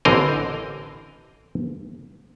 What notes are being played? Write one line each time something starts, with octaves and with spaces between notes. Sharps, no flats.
A1 D3 E3 C4 A#4 D#5